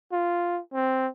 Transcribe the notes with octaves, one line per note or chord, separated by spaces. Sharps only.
F4
C4